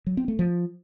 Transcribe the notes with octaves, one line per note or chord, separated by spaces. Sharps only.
F#3
C4
A3
F3